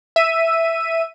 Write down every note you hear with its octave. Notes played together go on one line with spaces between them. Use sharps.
E5 D#7